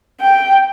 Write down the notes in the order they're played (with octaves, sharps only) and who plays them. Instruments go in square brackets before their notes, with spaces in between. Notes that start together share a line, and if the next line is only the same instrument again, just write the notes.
[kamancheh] G5